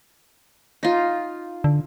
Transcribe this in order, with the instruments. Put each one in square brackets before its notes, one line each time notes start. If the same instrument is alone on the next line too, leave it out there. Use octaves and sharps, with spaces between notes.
[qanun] D#4 F4
[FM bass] D3